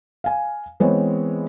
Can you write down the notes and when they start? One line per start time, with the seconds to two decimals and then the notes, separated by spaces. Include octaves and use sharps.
0.24 F5 G#5
0.80 E3 G#3 B3 C4 C#5